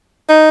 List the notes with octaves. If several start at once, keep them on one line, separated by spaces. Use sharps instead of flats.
D#4